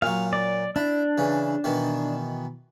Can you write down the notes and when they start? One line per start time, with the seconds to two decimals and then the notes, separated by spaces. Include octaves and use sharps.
0.02 A#2 F#3 F5
0.33 D5
0.76 D4 E4
1.18 C#3 E3
1.64 B2 D#3 E3